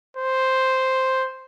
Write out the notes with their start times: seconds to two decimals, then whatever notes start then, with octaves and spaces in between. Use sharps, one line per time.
0.17 C5